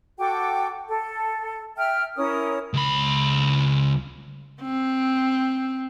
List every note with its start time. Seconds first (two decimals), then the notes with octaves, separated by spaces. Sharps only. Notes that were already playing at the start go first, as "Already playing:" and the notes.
0.19 F#4 A4 G5 D6
0.89 A4
1.77 E5 G5 F6
2.17 C#4 E4 A#4 D#6
2.74 C#2 B5
4.62 C4